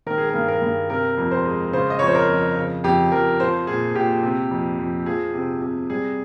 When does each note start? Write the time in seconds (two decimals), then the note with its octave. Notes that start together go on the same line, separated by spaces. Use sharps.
0.06 D#3 A#4
0.18 G#4
0.30 G2 A#4
0.48 A#4
0.62 G2
0.90 C3 A#4
1.17 F2
1.31 C5
1.46 G#3
1.73 C#3 C5
1.90 D#5
1.99 F2 C#5
2.07 C5
2.15 A#4
2.29 F2
2.56 C#3
2.84 F2 G4
3.12 F2 A#4
3.40 F3 C5
3.67 A#2 G#4
3.95 A#2 G4
4.23 C3
4.51 F2
4.79 F2
5.06 F3 G#4
5.34 C3
5.62 C3
5.89 G3 G#4